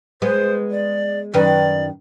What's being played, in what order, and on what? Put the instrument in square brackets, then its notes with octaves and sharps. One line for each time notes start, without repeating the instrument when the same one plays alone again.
[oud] G#3 B3 [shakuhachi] C5
[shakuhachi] D5
[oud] F#2 D#3 B4 [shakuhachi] D5